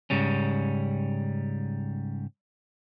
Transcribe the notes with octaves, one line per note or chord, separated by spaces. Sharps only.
G#2 C#3 G3 C#4